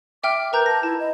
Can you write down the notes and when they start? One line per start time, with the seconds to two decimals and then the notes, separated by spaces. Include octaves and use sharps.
0.24 E5 G5 D6 F6
0.53 A#4 B4 A#5 G6
0.66 A5 A#6
0.83 E4 A5
0.99 D#5